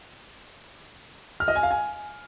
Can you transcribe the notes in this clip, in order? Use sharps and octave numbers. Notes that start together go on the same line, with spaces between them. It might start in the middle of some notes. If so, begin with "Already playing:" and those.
F6
D#5
G#5
F5
G#5